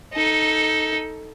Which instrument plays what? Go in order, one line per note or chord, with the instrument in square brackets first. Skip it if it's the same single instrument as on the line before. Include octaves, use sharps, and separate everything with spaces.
[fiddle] D#4 A4